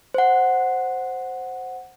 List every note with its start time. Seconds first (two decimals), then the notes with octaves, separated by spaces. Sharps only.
0.14 C5 F#5